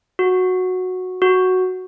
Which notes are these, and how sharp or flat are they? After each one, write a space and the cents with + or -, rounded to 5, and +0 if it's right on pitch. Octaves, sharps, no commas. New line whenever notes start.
F#4 -10
F#4 +0